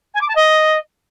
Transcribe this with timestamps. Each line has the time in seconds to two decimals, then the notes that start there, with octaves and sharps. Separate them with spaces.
0.14 G#5
0.21 D6
0.28 A5
0.35 D#5